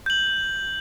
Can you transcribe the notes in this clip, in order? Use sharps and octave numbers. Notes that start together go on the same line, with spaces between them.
G6 F#7